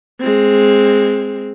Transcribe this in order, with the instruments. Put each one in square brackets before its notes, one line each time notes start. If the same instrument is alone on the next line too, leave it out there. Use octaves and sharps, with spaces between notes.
[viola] G#3 C4